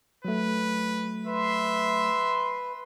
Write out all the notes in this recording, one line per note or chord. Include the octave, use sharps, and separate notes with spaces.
F#3 A3 B4
B4 E5 C6